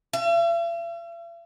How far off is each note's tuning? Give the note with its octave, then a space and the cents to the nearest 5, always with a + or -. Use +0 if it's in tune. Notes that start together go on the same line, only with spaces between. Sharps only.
E5 +45